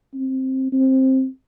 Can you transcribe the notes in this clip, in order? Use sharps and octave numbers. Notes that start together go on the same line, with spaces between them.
C4
C4